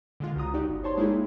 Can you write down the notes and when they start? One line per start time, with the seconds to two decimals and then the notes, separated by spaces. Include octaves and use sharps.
0.20 D3 G#3 F4
0.36 C#2 F#4 A#5 D#6
0.54 D#4 F#4 G4 D5
0.69 G1
0.83 C5 C#5 A5 C6
0.97 G#3 A#3 D#4 E4 G4 G#4